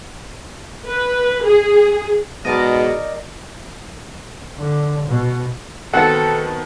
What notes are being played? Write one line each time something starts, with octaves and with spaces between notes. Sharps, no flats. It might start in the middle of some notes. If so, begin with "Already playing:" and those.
B4
G#4
G#2 B2 A#4 D5 D#5
D3
B2
D#3 B3 C4 F#4 A4 B4 F#5 A5